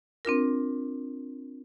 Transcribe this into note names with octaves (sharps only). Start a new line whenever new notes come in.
C4 D4 F4 A#4